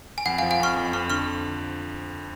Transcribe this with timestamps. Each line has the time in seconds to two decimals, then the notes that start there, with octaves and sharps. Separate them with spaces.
0.18 G#5
0.26 F2 F#5
0.38 F5 G#5
0.43 F3
0.51 F5 G#5
0.60 F2 C#6 F6
0.76 F2
0.93 F2 C#6 F6
1.10 D3 C#6 F6